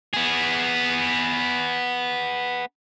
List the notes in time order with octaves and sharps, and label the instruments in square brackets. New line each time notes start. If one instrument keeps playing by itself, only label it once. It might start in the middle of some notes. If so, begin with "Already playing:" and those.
[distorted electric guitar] B3 G#4